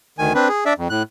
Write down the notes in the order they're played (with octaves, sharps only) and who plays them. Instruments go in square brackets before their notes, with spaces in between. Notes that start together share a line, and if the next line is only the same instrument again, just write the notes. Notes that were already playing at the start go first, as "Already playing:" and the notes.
[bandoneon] D2 D#3 G#5
C4 D4 B4
G#4
D4 D5 E5
F2
A2 F#6